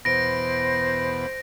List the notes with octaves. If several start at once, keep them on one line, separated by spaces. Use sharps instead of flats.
E2 B2 B3 C5 A#6 D7